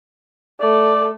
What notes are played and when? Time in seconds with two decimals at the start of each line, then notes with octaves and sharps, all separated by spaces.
0.61 A3 A4 D5